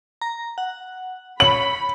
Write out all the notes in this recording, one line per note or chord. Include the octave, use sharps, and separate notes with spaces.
A#5
F#5
C#5 B5 F#7